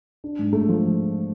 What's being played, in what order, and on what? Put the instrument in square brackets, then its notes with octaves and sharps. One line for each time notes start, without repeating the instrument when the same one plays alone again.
[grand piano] D4
G#2
A3
F3